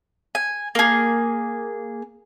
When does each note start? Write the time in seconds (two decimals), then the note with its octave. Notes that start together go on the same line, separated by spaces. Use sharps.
0.35 G#5
0.75 A#3 G#4